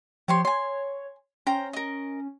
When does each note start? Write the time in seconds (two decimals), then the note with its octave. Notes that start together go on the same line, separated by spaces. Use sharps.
0.28 F3 G4 C#5 C6
0.45 C#5 G#5 C6
1.47 C#4 C5 G5 A#5
1.73 A#4 D#5